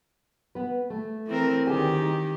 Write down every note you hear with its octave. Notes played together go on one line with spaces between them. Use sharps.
B3 B4
A3
E3 C4 A#4
D2 D#3 G4 G#4 G#5
D#4